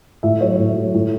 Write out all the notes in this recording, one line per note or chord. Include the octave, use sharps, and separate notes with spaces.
A2 E5
F#3 C#5
A2
F#3
A2